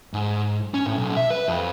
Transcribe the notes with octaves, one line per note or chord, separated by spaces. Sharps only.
G#2
C#4
A2
B1
E5
B4
F2